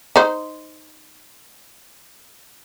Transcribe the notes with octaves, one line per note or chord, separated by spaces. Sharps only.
D#4 C5